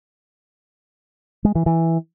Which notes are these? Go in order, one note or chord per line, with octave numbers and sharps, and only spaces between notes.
G#3
E3
E3